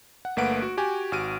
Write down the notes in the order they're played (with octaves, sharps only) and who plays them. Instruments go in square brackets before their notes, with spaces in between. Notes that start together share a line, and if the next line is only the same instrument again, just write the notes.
[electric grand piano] F#5
G1 A3 A#3 B4 F#5 D7
F#4
F#4 G4 G#5
G#1 F#4 F6 D7 D#7